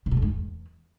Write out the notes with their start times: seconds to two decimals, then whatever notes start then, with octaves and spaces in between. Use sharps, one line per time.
0.06 C3
0.11 B2
0.17 F2
0.22 G#2
0.28 E2